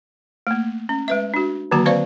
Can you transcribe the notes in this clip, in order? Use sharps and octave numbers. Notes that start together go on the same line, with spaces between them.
A3 A#3
C#4
G#3 B4 E5
D4 F#4
D3 D#3 F#3 A#3 F#4 A5
C4 B4 C5 D5 F5 C#6